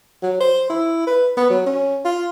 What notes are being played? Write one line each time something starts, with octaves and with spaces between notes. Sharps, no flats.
F#3
C5
E4
B4
B3
F#3
C#4
F4